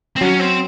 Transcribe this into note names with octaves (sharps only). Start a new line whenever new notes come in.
C4
F#3 C#4
C4